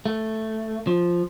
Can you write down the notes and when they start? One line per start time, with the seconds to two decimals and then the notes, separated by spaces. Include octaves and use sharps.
0.06 A3
0.87 F3